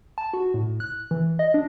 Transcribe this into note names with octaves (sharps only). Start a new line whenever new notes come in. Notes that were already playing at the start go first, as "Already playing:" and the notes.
A5
F#4
A2
F#6
E3
D#5
D4